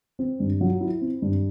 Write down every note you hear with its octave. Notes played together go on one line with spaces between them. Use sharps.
C4
G2
F#3
E4
C4
G2